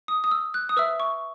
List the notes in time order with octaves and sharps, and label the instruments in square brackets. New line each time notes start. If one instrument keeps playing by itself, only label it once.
[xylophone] D#6
D#6
E6
F#6
D#6
B4 E5 E6
C#6